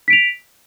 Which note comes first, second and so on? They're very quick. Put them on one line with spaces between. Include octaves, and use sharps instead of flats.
B6 D7 F7